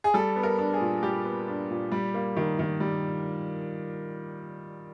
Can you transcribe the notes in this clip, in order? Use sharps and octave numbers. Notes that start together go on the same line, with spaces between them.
G#4
G3 A4
B3
A#4
D4
G#4
A#2
G3 G4
B3
D4
A#2
G3
A#3
D#3
D#3
G3